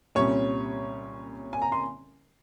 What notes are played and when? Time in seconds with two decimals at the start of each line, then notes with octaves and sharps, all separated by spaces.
0.15 C2 A#2 G3 C#4 C#5 C#6
1.53 G#5
1.62 A#5
1.72 C6